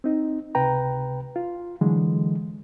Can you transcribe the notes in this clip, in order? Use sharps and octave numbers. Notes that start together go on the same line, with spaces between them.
C4 D#4
C#2 C3 B4 G5 A#5
F4
D3 E3 F#3 G#3